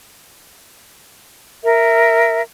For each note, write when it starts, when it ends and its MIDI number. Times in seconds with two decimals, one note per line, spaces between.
1.63 2.41 70
1.63 2.41 76